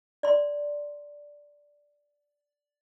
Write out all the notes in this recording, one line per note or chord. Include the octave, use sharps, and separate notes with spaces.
D5 C6